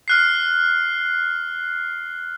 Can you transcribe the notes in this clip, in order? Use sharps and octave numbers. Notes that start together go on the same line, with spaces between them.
F6 F#6 C7